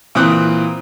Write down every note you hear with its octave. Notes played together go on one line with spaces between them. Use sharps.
A#2 E3 C4 D#6 F#6